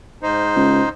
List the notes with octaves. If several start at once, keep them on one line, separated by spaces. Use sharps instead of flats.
G#2 D#4 C5
C#2